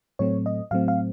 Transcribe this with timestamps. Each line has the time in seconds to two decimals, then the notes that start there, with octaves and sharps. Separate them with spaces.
0.19 A2 F#3 A3 C4 C#5
0.46 D#5
0.71 A2 F#3 A3 C4 F5
0.88 F5